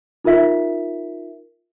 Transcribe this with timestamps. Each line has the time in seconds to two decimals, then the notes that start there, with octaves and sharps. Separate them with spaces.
0.24 D#4 F4 A#4 E5 B6